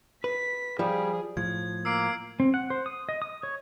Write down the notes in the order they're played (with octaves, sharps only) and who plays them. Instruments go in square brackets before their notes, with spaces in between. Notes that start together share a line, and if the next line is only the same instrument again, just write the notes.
[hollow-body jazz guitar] B4 [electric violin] B6
[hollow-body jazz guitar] F3 [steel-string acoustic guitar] G3 [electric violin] G#4
[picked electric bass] A2 F3 [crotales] G#6
[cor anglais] A#3 [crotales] E6 C7 D7
[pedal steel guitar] C4
F#5
C5
D#6
D#5
D#6
C#5